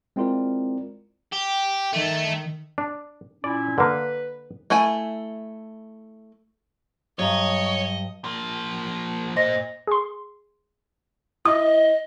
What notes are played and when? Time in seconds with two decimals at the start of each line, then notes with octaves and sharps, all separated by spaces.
0.16 G#3 C4 E4 F4 A#4 D5
1.33 G4
1.93 D#3 A3
2.78 D4
3.44 A#2 C#4 E4 D5
3.78 D3 A#3 B4
4.70 A3 E4 G#5
7.19 G2 F#3 C#5 D#5 A#5
8.24 F3 A#3
9.36 A#2 C5 D#5 A#6
9.87 G#4 C6
11.46 E4 D#5 D#6